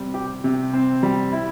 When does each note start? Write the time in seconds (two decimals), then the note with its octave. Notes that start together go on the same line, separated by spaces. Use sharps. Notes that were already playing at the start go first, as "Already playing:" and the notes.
Already playing: C3 G3 C4
0.14 G4
0.44 C3
0.73 C4
1.03 G3
1.32 E4